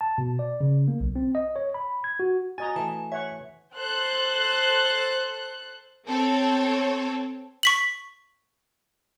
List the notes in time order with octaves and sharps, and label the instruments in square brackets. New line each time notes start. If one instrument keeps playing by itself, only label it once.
[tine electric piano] A5
B2
D5
C#3
A#3
B1
C4
D#5
C#5
B5
G#6
F#4
[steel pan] F#4 D#5 A#5 [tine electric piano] G#5 [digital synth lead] A6
[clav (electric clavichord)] E3 A3 [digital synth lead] A5
[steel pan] C#5 F#5 C#6 [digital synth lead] E5
[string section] A4 C5 F#6
C4 A4 C#5
[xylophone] C#6 B6 F#7